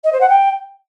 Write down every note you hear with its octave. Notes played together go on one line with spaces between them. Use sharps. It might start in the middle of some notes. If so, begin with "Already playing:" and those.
D#5
C5
F#5
G5